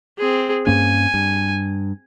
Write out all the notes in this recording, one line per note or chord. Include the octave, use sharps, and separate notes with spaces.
C4 G#4
G2 A#3 C#4 G#5
G2